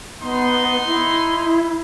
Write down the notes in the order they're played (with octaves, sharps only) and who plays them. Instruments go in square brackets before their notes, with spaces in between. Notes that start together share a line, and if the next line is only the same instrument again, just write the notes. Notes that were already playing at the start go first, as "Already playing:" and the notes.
[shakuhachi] B3 [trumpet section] D#4 C6
[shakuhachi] E4